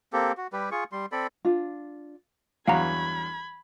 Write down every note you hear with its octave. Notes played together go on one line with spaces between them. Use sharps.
A#3 C4 G4 A4
F#4
G3 G4 B4
F4 G#4 C#6
G3 C6
C4 A4 D5 B5
D4 F4
E2 G2 F#3 F5 F#5 A#5 B5 G#6